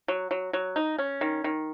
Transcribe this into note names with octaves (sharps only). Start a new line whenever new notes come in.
F#3
F#3
F#3
D#4
C#4
D#3
D#3